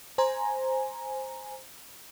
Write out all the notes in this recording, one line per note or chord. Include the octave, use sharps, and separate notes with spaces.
C5 G#5 A#5